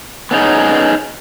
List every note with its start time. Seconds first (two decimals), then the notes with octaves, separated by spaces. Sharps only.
0.31 B3 C#4 D#4 G#4